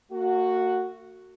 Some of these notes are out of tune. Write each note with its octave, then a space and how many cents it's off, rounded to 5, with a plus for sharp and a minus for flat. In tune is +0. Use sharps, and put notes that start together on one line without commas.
A#3 -45 F#4 +0